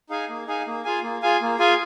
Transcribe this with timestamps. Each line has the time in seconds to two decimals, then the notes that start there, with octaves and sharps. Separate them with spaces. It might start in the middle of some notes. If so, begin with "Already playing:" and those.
0.10 D#4 G#4 F5 G#5
0.29 A#3
0.47 D#4 G#4 F5 G#5
0.67 A#3
0.84 F4 G#4 F5 G#5
1.03 A#3
1.22 F4 G#4 F5 G#5
1.41 A#3
1.59 F4 G#4 F5 G#5